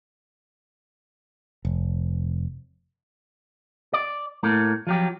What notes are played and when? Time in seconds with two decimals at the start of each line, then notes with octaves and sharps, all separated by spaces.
1.65 F1
3.93 D5
4.43 A2 A3 A#3
4.87 F3 F#3 G4